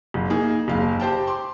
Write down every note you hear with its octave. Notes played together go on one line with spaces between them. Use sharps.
F#1
A#3 D#4 G#4
F#1 D#2 F5
G4 C5 G5 A5
C6 D6